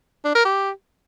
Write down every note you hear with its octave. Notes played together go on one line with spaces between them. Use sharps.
D4
A#4
G4